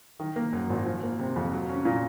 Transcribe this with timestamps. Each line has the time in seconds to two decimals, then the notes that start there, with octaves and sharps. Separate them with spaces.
0.20 D#3
0.36 A#3
0.53 F#2
0.70 G#1
0.85 F3
1.03 A#3
1.19 C3
1.36 F2
1.52 F#3
1.69 C#4
1.85 A#2